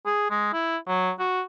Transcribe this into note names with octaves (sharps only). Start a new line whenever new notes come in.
G#4
G#3
E4
F#3
F#4